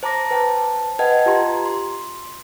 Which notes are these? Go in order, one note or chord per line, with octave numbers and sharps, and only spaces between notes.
C5 A5 A#5 D6 A#6
B4 C5 G5 A5
B4 D#5 F#5 G5 A5 G#6
F4 G4 A#5 C6
C6